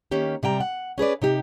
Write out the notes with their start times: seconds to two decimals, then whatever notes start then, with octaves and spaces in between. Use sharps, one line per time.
0.11 D#3 A#3 C#4 G4
0.43 C3 G3 G5 A#5
0.60 F#5
0.98 C#4 G#4 B4 D5
1.22 C3 D#4 G4